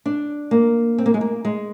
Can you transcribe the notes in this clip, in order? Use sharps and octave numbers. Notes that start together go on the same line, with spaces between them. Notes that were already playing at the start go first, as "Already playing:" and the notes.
D4
A#3
C4
A#3
G#3
A#3
G#3